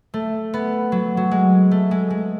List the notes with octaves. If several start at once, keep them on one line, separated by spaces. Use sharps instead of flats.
A3
B3
F#3
F#3
G#3
A3
G#3
G#3